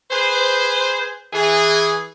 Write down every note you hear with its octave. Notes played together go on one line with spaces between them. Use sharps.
G#4 B4 C5
E3 G#4